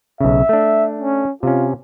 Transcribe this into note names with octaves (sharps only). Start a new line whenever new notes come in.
B1 C#3 E5
A3 D4
C#4
C3 C#4 F4